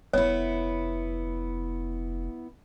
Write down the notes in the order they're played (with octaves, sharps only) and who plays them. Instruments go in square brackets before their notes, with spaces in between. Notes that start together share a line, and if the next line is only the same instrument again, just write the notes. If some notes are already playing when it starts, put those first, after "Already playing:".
[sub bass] F1 [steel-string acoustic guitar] B3 E4 [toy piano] C#5